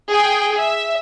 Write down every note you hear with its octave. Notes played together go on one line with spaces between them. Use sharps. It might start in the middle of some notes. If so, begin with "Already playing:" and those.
G#4 G5
E5